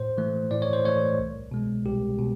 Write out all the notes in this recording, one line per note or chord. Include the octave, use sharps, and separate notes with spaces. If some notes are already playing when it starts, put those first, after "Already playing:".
Already playing: A2 C5
E3 A3
A2 D5
C#5
C5
E3 A3 C#5
C2
B2 G#3
C2 G4
B2